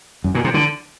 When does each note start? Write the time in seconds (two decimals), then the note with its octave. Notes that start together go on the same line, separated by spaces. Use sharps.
0.24 F#2
0.35 A#2
0.44 C3
0.54 D3